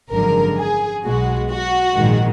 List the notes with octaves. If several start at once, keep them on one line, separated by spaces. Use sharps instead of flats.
G#1 F#2 D3 F3 G#3 A#4
G#4
B1 B2 G#3 F#4
F#4
A#1 G#2 D#3 G#3